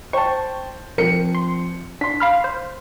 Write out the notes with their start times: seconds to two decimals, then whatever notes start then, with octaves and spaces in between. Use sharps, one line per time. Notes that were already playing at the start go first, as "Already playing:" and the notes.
0.13 C5 G5 A5 C#6
0.98 F3 C4 A#4 C#7
1.35 C6
2.01 D4 C6 B6
2.20 F5 B5 F6
2.44 C5